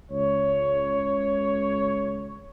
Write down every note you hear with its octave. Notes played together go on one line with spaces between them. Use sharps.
C#2 C#5